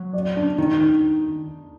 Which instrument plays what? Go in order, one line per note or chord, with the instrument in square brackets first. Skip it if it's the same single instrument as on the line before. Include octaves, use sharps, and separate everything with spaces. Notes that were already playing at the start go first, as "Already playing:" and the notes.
Already playing: [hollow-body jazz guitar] F#3
[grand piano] D5
D4
[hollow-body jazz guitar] D#3 [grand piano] D#4